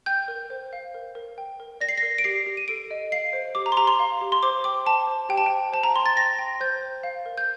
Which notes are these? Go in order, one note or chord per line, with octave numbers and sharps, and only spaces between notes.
G5 G6
A#4
C5
F5
A#4
A#4
G5
A#4
D5 A#6
C7
A#6
A#4
D7
G4 C7
G4
D#7
A4 D7
D#5
F5 C7
C5
G4 D6
A#5
C6
G4 A#5
C6
F5
G4
C6
C5 D6
G5 D6
G5 A5
C5
G4 G5
A5
G5
C5
C5 A5
A#5
G5 C6
A6
G5 A#6
G5
C5 G6
C5
F5
A#4
G6